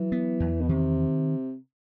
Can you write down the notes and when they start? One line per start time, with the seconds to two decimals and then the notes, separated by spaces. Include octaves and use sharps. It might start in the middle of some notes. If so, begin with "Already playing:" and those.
Already playing: E3 F#3
0.12 B3
0.40 E2
0.62 B2
0.68 C3 D#3